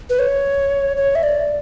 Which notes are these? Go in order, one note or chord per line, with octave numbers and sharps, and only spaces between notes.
B4
C#5
C#5
E5
D5